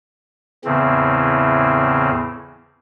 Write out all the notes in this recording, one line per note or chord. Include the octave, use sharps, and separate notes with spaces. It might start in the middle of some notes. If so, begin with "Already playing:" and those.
E2 A2 C#3 E3 C4